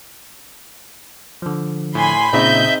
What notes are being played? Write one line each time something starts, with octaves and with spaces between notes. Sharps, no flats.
D3 F3
A2 G#5 B5 C6
A#2 C#3 C4 D#4 G#4 D#5 E5 G6